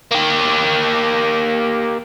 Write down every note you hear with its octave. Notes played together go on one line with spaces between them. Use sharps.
A#3 G4